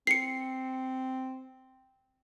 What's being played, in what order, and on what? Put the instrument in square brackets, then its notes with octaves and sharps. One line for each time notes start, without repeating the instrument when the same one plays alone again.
[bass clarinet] C4 [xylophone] C7 C#7